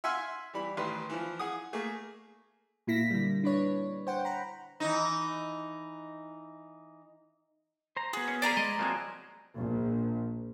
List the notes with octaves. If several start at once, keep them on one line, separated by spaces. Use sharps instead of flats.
E5 F#5 G#5 C6 E6 F6
E3 G3 B5
A1 D#3 B4 C6
E3 F3
G#4 F#5 D#6
A3 A#3 G#4
A#2 A#3 E4 A#6 B6
D3 G3
D4 B4 C#5
C5 F#5 G5
A#5 B5
E3 D#4
C5 A#5
B3 F#4 G#4
A#3 C#4
G#4 A#4 C5 D5 A#5 B5
G#3 D#5
F3 F#3 G#3 A#3 C4 G#5
A#1